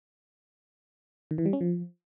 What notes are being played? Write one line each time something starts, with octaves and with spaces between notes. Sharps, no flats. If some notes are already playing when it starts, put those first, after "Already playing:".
D#3
E3
G3
C#4
F3